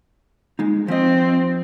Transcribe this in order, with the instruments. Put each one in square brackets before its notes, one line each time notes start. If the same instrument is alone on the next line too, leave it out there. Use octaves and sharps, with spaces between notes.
[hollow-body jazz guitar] G#3 D#4
[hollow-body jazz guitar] F3 D#5 [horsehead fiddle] C4